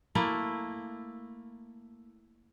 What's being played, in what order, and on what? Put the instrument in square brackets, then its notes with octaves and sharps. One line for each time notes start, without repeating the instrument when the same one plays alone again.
[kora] A3 A#3 E4